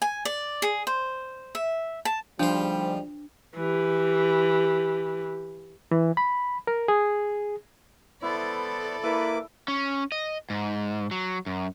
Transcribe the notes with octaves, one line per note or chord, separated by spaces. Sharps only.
G#5
D5
G#4
C5
E5
A5
D2 G#2 F3 G3 D4 C5
E3 G4
E3
B5
A#4
G#4
B3 E4 A4 C5 D5
A#3 E4 B4 E5 D6
C#4
D#5
G#2
F#3
F#2